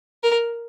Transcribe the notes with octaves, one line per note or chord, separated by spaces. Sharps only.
A#4